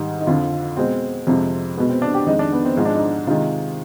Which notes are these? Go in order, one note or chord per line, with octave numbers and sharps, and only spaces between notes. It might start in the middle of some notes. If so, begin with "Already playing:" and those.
Already playing: G#2 D#3 G3
D#4
F2 D3 F3 F4
B2 G#3 C4
F2 C3 F3 G#3
B2 G#3 B3
C4
D4
G4
F2 D#3 G#3 D#4
D4
B3
C4
G#2 F3 G#3 D#4
D4
D#4
C3 D#3 G#3 F4